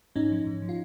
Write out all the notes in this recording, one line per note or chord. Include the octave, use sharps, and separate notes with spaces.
G#2 C#4 D#4
F3
G#2
F3
F4